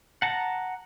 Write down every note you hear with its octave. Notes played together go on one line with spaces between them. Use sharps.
F#5 A5 A#5